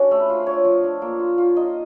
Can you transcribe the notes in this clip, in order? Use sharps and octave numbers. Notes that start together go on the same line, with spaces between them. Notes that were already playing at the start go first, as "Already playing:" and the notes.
Already playing: C#4 D4 F#4
A3
B4
F4 C5
D4 C#5
F3
D4
A#3
F4
F4
D#4 D#5